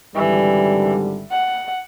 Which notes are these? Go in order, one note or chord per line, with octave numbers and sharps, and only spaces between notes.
G#1 D3 E3 G3
F#5